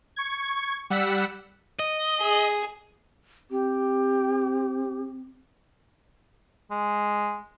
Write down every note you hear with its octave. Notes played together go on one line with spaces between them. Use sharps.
C#6 G#6
G3 F#5 E6 B6
D#5
G#4
C4 G4
G#3